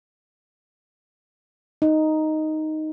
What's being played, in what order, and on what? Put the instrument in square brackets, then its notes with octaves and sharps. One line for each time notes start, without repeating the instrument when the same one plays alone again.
[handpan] D#4